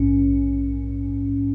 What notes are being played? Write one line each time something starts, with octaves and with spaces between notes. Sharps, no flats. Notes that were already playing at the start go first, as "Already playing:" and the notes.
Already playing: A#1 G#2 C#4